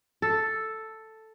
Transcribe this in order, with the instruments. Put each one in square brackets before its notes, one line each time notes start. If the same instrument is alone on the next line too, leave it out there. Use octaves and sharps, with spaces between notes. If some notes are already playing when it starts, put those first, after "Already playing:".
[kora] A4